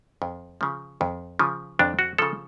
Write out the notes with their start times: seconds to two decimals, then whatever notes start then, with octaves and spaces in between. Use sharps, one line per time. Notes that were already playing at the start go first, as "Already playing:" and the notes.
0.22 F2
0.61 C#3 F3
1.01 F2
1.39 C#3 F3
1.79 F2 D4
1.99 F#4
2.18 C#3 F3 A4